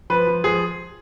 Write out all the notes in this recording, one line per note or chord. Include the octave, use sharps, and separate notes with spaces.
F3 B4
F3
F3 G#4